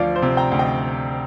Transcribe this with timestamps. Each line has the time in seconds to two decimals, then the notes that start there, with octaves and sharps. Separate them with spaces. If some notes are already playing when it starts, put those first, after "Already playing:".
Already playing: D2 F3 D5 F5
0.16 C5
0.22 C3
0.37 G5 A#5
0.52 D2
0.59 D#5 G5